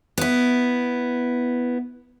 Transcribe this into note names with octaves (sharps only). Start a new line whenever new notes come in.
B3 E4